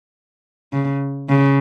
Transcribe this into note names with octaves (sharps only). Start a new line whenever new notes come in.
C#3
C#3